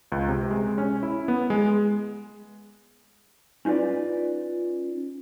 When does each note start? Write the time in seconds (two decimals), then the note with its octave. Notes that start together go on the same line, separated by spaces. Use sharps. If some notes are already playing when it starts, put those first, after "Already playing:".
0.12 C#2
0.28 C3
0.51 G#3
0.78 C#4
1.03 E4
1.28 B3
1.50 G#3
3.65 C#4 D#4 F4 B4 D5